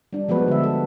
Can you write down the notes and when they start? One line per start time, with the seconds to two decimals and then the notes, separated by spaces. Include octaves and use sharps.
0.13 G3 D4
0.28 F3 G#3 B3 F#4 B4
0.48 D3 E5
0.64 A4